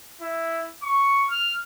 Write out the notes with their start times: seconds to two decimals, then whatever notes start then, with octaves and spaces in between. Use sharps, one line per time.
0.21 E4
0.83 C#6
1.30 F6